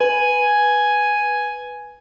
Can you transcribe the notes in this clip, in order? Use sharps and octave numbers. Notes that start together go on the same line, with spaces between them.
B4 G#5